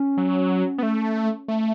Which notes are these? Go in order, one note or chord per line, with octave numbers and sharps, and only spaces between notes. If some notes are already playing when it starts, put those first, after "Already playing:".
Already playing: C#4
F#3
B3
A3
A3